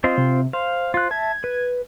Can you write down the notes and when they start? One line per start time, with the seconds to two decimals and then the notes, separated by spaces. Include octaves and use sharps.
0.04 C4 F4 C5 D#5
0.18 C3
0.53 C5 F5
0.94 F4 F#6
1.11 E5 A5 G#6
1.44 B4